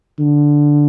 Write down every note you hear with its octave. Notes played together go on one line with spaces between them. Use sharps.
D3